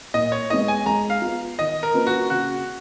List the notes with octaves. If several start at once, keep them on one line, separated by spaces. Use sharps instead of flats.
A#2 D#5
C#5
G#3 B3 D#4 D#5
G#5
G#3 A#5
F5
B3 F4
D#3 D#5
A#4
A#3 C#4 F4 B4
F#4
C#3 F#4